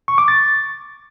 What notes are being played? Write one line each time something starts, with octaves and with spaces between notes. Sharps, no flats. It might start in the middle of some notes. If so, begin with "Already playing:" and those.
C#6
D6
A6